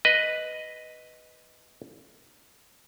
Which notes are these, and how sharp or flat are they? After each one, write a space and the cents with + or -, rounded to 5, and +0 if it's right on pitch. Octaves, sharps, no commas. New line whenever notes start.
B4 +0 D#5 +0